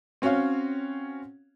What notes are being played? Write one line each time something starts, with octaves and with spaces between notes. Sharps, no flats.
C4 C#4 F#4 C#5 F5